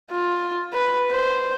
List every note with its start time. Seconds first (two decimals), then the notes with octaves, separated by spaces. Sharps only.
0.11 F4
0.73 B4
1.11 C5